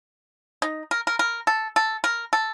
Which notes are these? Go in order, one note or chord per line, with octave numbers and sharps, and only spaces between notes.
D#4
A#4
A#4
A#4
A4
A4
A#4
A4